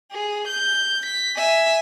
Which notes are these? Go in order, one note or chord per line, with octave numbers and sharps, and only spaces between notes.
G#4
G6
B6
E5 G#5